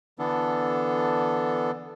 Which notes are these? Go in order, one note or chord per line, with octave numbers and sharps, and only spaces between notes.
D3 E3 B3 D4 A4